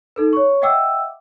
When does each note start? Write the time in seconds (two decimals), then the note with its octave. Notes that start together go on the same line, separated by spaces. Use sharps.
0.16 D#4 A4 B4
0.33 C#5 C#6
0.62 D#5 E5 F#5 G5 D6 E6